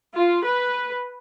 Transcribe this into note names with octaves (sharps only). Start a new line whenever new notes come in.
F4
B4